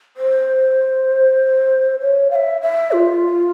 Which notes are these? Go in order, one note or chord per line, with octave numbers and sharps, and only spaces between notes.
C5
C#5
F5
E5
E5
F4